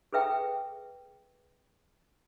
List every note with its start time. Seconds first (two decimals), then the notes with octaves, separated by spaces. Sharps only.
0.13 G#4 A4 B4 E5 G5